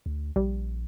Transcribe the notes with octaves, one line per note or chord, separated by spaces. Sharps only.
D2
A#1 G3